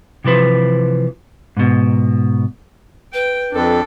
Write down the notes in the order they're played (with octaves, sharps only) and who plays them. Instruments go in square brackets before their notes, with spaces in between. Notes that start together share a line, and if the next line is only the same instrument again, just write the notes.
[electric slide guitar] C3 E3 F3 B4 C5
G#2 B2
[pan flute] B4 [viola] G5
[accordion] F2 [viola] D4 A4